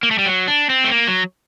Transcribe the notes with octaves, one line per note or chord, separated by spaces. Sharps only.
A#3
A3
G3
F#3
D4
C4
A3
A#3
F#3